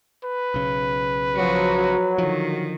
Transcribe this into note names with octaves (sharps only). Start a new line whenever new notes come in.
B4
B1 C#3
F3 F#3 F#4
D3 D#3 F3